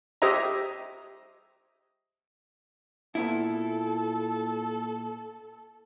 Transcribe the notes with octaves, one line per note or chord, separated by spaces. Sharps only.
G4 C5 D#5 E5 A#5
A#2 B3 E4 A4